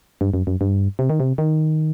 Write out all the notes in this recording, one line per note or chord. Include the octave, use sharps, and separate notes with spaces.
G2
F#2
F#2
G2
C3
D#3
C3
D#3